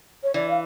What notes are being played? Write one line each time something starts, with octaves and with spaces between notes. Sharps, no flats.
C#5
E3 D5
F5